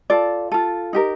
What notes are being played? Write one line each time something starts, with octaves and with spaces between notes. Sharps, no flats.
F4 A4 D5
F4 A4
D#4 G4 A#4